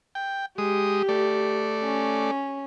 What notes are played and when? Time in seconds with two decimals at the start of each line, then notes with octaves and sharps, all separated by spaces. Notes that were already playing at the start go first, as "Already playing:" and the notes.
0.15 G5
0.58 G#3 G4 D#6
1.09 A3 D5
1.84 C#4